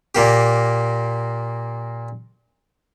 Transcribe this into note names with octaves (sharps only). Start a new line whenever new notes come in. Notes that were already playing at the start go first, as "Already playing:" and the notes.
A#2 A#3 G4